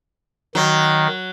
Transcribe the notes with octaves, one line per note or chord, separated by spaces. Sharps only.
D#3 F#3